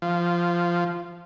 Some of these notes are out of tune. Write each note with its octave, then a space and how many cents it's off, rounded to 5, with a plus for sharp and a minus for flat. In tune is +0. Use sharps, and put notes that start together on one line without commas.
F3 -10